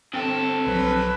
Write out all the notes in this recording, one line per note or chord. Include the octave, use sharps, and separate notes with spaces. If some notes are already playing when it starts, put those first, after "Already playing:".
G2 C4 A4
B1 F3 F#3 B4